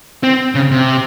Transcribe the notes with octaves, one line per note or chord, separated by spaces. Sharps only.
C4
C#3
C3